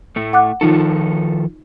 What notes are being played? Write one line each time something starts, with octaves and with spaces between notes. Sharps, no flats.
A2 A3
F#5 D6 F#6
D#3 F3 D#4 F4 A4